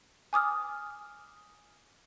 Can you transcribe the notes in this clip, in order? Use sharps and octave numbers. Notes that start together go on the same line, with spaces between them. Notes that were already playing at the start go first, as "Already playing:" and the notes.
G#5 D6 D#6 F6